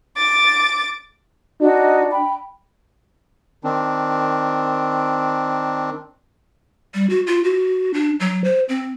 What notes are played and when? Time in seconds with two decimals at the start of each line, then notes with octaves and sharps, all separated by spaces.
0.16 D6 A6
1.61 D4 D#4 F#4
2.10 G5 B5
3.64 D#3 C4 D4
6.94 G3
7.10 F#4
7.27 F4
7.44 F#4
7.94 D4
8.20 F#3
8.44 C5
8.69 C4